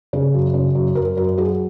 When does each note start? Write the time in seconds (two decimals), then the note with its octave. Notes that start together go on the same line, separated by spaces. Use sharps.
0.13 C#3 G#4
0.34 F#2
0.54 C#3
0.75 F#2
0.95 F#2 A#4
1.17 F#2 A#4
1.38 F#3 G#4